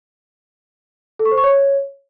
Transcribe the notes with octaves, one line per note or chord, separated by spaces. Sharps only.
A4
C#6
C5
C#6
C#5